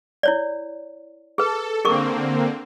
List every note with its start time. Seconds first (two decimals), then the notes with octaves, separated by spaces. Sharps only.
0.23 E4 C#5 D5
1.38 G#4 A4 B4
1.85 D3 A#3 C4 G#4 A#4 C#6